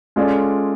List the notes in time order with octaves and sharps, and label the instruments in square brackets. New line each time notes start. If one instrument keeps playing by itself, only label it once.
[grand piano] G#3 C#4 F4 A4 D5